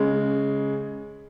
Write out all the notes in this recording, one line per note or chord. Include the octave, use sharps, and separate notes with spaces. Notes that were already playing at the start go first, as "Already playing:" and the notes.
Already playing: C#3 G#3